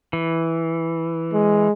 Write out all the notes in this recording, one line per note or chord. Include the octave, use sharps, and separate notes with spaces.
E3
G#3